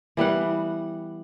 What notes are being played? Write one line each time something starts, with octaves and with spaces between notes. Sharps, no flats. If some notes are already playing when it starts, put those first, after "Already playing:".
E3 G3 B3 F#5